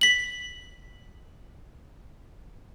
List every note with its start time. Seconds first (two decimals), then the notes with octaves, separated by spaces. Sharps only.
0.01 B6 F#7